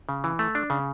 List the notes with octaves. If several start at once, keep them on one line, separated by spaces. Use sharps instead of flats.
C#3
E3
A3
D4
C#3